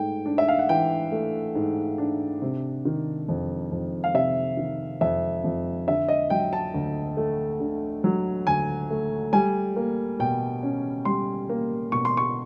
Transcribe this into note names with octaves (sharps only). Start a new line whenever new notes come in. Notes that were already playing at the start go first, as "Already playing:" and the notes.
Already playing: G#2 A3 G5
D4
E5
F5
F#5
E3 G5
A3
G#2
D4
C3
D#3
F2
F2
F5
C3 E5
D#3
F2 E5
F2
D3 E5
D#5
F#3 G5
A5
D2
A3
D3
F#3
D2 G#5
A3
G3 G#5
A#3
B2 G5
C#4
G3 C6
A#3
B2 C#6
C6
C#6